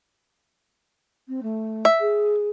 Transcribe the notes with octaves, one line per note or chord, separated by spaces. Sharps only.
C4
A3
E5
G#4